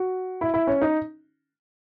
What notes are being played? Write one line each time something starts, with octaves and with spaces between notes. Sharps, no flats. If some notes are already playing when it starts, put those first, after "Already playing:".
Already playing: F#4
E4
E4
C#4
D#4